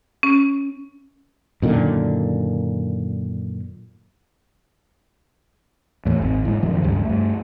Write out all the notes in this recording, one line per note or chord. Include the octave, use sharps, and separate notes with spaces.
C#4
F#2 A#2 D3 D#3
E2 A2
G#1
A2 G#3
F#2 D#3 F3
C#2 G2
G2 A3